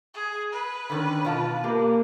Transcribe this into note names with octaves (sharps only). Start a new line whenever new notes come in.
G#4
B4
D3 D#3 C#4
B2 F4 A5
A#3 G4